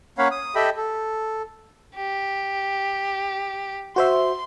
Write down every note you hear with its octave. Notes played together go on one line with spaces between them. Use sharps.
A#3 C#4 C#5 F5 F#5 B5
D#6
G4 A4 D#5 E5 G5 B5
A4
G4
F#4 C5 E5 C6